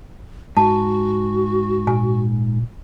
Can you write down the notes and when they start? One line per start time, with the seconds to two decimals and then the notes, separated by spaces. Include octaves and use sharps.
0.57 G#2 F#4 A5
1.87 A#2 G#5